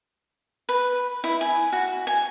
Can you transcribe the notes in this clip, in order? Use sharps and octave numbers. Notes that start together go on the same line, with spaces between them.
B4
E4
G#5
F#4
G#5